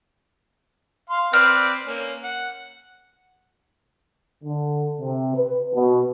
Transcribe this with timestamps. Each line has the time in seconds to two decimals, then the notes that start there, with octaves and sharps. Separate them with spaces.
1.09 F5 C6
1.33 C4 B4 D5 F6
1.86 A#3 C#4
2.23 F#5
4.44 D3
5.00 C3
5.35 B4
5.75 B2